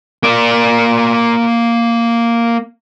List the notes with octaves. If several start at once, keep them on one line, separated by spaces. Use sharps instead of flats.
A#3 D5